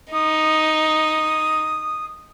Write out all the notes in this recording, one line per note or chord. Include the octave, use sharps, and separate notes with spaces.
D#4 D#6